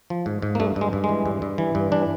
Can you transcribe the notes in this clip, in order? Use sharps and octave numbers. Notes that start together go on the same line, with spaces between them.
F3
G#2
G#2
A#3
G2 A3
G2
G#3
G2
G#3
E3
G2
G2
E3
G2
E3 D4